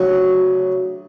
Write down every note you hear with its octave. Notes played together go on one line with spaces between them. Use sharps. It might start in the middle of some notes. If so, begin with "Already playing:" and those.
Already playing: D2 C#3 F#3